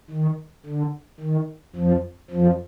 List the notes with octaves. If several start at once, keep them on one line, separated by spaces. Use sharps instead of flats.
D#3
D3
D#3
F2 F3
F2 F3